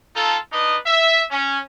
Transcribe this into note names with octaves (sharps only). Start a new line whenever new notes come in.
D#4 F4 A4
D4 D#4 B4 D#5
E5
C#4